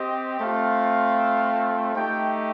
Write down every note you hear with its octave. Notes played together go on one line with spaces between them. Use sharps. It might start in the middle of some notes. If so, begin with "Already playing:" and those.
Already playing: C4 G4 D#5
A3 C4 F4 F5
A3 D#4 G4 G5